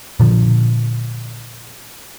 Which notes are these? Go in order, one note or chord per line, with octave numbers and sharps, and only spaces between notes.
A#2 D3 F3